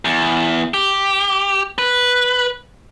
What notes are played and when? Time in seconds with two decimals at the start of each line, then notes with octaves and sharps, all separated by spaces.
0.05 E2
0.74 G4
1.78 B4